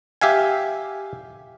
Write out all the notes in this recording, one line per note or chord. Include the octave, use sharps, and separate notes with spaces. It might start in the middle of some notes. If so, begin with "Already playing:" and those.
G4 E5 F5 G#5